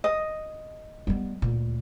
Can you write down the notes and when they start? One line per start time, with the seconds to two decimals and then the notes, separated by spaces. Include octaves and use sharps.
0.04 D#5
1.07 G3 B3
1.42 D2 A#2